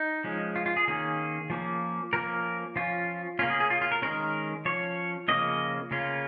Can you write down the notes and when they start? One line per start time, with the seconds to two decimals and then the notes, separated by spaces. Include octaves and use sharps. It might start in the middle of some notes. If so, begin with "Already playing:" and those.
Already playing: D#4
0.24 F3 G#3 C#4
0.56 F4
0.66 F4
0.77 G#4
0.88 D#3 A#3 C#4 G#4
1.50 F3 A#3 C#4
2.13 F3 A#3 C#4 A#4
2.76 F3 C#4 F4
3.39 C#4 F4
3.42 C#3 A#3
3.50 G#4
3.60 G#4
3.70 F4
3.82 F4
3.92 A#4
4.02 D#3 G#3 C#4 A#4
4.65 F3 C#4 C#5
5.28 C#3 F3 A#3 C#4 D#5
5.91 C#3 A#3 C#4 F4